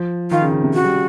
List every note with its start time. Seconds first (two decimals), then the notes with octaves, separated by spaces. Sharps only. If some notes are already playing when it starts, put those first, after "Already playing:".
Already playing: F3
0.31 D#3 F4
0.42 C#3
0.52 C#3
0.63 C3
0.74 C#3 F#4
0.85 G3